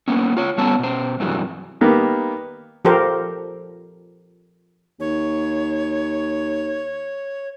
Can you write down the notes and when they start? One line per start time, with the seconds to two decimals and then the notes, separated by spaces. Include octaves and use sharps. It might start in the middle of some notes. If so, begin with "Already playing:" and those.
0.08 A#3 B3 C#4
0.37 F4 C#5
0.58 G3 B3 C#4 C#5 A5
0.79 B2 C5
1.20 G2 C3 E3 F#3
1.81 D#3 G3 A#3 B3 G4
2.85 F3 G4 A4 A#4 C5
5.00 D#2 C#5